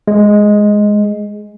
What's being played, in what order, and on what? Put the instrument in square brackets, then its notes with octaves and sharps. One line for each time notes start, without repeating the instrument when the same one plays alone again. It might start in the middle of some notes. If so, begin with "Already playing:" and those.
[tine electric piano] G#3